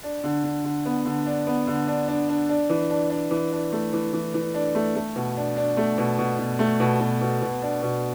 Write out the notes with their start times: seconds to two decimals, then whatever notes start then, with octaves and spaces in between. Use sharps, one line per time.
0.03 D4
0.24 D3
0.44 D3
0.64 D3
0.85 B3
1.05 D3
1.26 D4
1.47 B3
1.67 D3
1.87 D4
2.08 D4
2.29 D4
2.49 D4
2.70 E3
2.90 D4
3.10 D4
3.31 E3
3.52 D4
3.72 A3
3.93 E3
4.13 E3
4.34 E3
4.54 D4
4.75 A3
4.95 A3
5.16 B2
5.36 D4
5.57 D4
5.77 A3
5.98 B2
6.18 B2
6.39 B2
6.59 A3
6.80 B2
7.00 B2
7.21 B2
7.42 B2
7.62 D4
7.82 B2